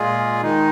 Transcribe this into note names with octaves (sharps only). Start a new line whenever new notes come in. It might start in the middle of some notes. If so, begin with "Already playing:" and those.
Already playing: A#2 G#3 F4 G#4
D#3 G#3 D#4